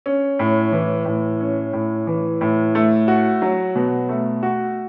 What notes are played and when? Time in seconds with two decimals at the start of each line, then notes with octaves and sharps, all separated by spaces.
0.06 C#4
0.39 A2
0.72 E3
1.06 A2
1.40 C#4
1.73 A2
2.07 E3
2.41 A2
2.75 A3
3.08 F#4
3.42 F#3
3.75 B2
4.09 A3
4.43 F#4